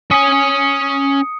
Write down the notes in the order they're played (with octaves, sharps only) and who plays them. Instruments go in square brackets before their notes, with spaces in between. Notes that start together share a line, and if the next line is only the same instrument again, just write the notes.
[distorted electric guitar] C#4 G#5 [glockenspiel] D#6 C#7